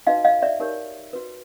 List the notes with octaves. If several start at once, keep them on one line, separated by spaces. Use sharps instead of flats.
D#4 F#4 B4 D#5 F5
D#5 F5
D5 E5
D#4 G4 A#4 C#5
F#4 B4